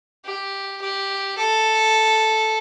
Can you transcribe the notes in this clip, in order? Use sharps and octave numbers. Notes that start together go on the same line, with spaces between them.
G4
G4
A4